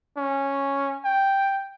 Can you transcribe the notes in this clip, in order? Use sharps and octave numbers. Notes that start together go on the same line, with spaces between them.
C#4
G5